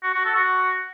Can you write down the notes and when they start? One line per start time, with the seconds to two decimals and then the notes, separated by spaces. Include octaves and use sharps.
0.03 F#4
0.14 F#4
0.25 A4
0.36 F#4